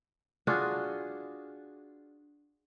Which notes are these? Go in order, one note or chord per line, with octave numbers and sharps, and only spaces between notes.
D4 F4 F#4 G#4